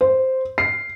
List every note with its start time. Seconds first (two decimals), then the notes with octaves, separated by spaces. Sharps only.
0.01 C5
0.58 C7